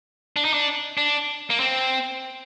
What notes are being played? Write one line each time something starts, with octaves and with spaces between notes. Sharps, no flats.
D4
D#4
D4
D4
A#3
C4